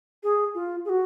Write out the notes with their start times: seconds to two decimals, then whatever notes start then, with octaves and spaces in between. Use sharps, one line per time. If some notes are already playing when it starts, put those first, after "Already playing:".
0.23 G#4
0.55 F4
0.85 G#4
0.89 F#4